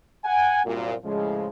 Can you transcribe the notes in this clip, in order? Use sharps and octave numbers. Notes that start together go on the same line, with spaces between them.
F#5 G#5
C2 F#2 A#2
A2 C#3 F3 G#3